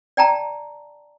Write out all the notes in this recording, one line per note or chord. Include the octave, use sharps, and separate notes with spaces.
D5 G5 A5 A#5